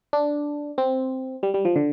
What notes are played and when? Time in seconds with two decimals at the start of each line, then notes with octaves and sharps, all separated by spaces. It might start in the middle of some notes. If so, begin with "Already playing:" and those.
0.13 D4
0.78 C4
1.43 G3
1.54 G3
1.65 F3
1.76 D3